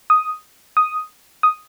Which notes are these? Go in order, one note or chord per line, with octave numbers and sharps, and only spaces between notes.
D#6
D#6
D#6